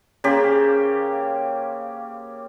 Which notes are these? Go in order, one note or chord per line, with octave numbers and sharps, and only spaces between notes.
C#3 A#3 G4 C5